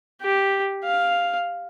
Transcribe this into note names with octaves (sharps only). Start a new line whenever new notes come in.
G4
F5